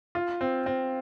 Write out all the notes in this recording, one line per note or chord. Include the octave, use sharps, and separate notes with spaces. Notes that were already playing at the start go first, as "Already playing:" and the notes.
F4
C4
C4